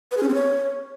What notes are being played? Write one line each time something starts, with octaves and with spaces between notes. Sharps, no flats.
B4
G#4
C#4
C4
C#5